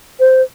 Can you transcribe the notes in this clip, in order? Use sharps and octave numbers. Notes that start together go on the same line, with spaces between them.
C5